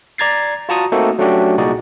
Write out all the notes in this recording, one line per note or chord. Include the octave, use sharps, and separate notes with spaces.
D5 A#5 G#6 A6 C7
F4 F#4 A5 A#5 C#6 D#6
A3 A#3 C4 D#4 F#4 A4
F#3 A3 C#4 D4 F#4 G4
C2 A#2 D#4 F#4 G#4 D5